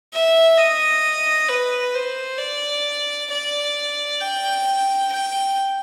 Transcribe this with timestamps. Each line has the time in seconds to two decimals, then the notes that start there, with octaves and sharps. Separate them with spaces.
0.13 E5
0.57 D#5
1.49 B4
1.94 C5
2.39 D5
3.30 D5
4.20 G5
5.11 G5